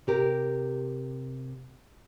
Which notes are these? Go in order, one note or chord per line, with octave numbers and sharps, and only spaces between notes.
C3 G4 A#4